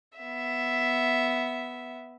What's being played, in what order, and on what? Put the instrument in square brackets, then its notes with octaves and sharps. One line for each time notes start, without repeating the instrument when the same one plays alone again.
[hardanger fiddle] B3 E5